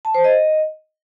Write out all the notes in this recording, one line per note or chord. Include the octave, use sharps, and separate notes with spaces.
A5
C5
D#5